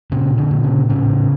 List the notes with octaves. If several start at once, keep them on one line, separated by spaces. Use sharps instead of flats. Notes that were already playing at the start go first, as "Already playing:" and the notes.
A#2 C#3 C#4
D3 D4
A#2
C#3 C#4
A2 C#3 C#4